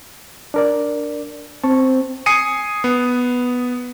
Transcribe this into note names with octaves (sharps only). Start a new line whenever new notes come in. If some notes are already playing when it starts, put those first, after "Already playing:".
D4 A#4 D5
C4 A5 C#6
G#5 D#6 C7 C#7 D#7
B3